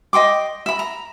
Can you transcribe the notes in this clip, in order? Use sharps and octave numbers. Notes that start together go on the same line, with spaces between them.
D#5 G5 C6 D6
E5 B5
A#5